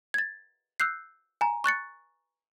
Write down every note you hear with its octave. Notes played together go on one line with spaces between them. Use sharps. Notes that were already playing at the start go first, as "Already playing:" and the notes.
G#6 A6
E6 F#6 G6 C7
G#5 A#5
C#6 F#6 A6 C#7